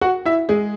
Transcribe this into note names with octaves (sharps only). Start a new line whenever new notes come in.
F#4 F#5
E4 E5
G#3 G#4